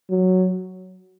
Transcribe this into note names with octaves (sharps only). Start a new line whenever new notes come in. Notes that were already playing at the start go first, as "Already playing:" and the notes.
F#3